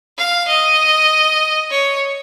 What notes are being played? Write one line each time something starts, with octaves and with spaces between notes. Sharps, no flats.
F5
D#5
C#5